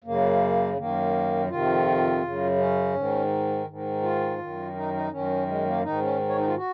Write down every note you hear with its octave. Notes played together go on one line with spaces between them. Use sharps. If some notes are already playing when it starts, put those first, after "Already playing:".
F#2 C#3 A#3
F#2 D#3 A#3
F2 C3 D#3 F4
F#2 C#3
C#4
G#2 D#3
G#2 D#3
F4
F#2 D#3
D#4
D#4
F#2 D#3 C#4
G#3
A#3
G#2 D#3 D#4
C#4
C#5
D#4
F4
F#4